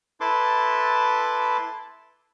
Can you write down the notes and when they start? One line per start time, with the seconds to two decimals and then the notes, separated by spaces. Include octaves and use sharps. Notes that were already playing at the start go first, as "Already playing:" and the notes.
0.21 E4 A4 B4 A5 C6 D6